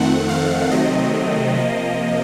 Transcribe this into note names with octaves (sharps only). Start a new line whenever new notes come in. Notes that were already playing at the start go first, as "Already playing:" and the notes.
Already playing: F2 D#3 A3 C4 F#5
F5
C3 D#3 F#3 A3 C4 D#5
C3 F3 A#3